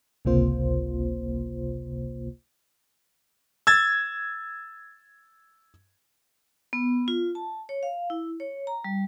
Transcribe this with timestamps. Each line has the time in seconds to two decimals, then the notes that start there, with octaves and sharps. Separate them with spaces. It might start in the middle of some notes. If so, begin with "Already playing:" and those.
0.25 G#1 C#2 C3 A#3 F4 C5
3.67 E6 G#6 A6
6.73 B3
7.08 F4
7.35 A5
7.69 C#5
7.83 F5
8.10 E4
8.40 C#5
8.67 A#5
8.84 G3